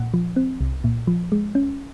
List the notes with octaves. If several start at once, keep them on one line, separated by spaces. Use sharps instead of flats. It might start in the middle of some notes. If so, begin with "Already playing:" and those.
Already playing: A#2 F#5
F3
C4
C2
A#2
F3
G#3
C#4